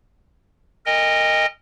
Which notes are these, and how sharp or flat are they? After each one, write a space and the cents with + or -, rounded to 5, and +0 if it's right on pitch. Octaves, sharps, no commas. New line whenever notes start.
A#4 -20 D#5 +0 G5 +45